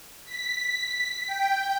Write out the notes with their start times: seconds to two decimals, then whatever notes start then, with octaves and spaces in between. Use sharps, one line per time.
0.25 B6
1.27 G5